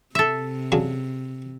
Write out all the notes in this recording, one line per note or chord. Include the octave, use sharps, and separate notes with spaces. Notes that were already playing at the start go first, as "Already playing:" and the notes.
C3 A4 E5
C#3 F#3 D4